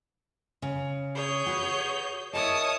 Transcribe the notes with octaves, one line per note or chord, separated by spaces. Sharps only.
C#3
G#4 C#5 G6
F#4 B4
E4 A#4 C#5 D#5 A5 D#6